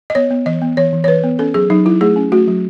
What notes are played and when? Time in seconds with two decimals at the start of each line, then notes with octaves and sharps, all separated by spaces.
0.10 D#5
0.15 B3 C#5
0.31 B3
0.46 E3 D#5
0.62 B3
0.77 E3 C#5
0.93 E3
1.04 C#5
1.08 E3 B4
1.24 B3
1.39 C#4 A4
1.54 F#3 G#4
1.70 F#3 D#4
1.85 F#3 E4
2.01 A3 G#4
2.16 C#4
2.32 A3 F#4
2.48 F#3